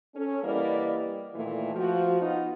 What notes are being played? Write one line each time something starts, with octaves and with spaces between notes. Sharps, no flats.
C#4 A4
E3 G3 A#3 B3 D5 D#5
A#2 D#3 E3 A3
F3 F#4
B3 D#4 F4